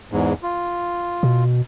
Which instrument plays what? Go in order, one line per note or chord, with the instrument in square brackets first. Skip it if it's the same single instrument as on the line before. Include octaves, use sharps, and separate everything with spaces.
[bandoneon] E2 G#2
F4
[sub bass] B2